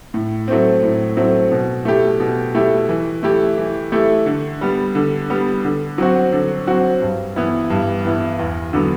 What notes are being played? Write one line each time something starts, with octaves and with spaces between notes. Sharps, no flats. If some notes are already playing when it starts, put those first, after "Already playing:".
A2
F#3 A3 C4
A2
F#3 A3 C4
B2
A3 E4 G4
B2
A3 E4 G4
E3
A3 E4 G4
E3
A3 E4 G4
D3
G3 B3
D3
G3 B3
D3
F#3 C4 F#4
D3
F#3 C4 F#4
G2
E3 B3 E4
G2
E3 B3 E4
E2
D3 F#3 B3